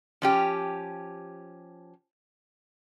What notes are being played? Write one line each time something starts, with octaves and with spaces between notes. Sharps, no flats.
F3 C#4 G4